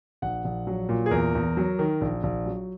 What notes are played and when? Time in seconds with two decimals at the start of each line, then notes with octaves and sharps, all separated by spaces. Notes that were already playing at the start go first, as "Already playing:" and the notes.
0.22 A#1 F#5
0.45 A#1
0.67 F#3
0.89 A#2
1.06 G#4
1.11 E2 A#4
1.35 E2
1.57 F#3
1.79 D#3
2.01 A#1
2.23 A#1
2.46 F#3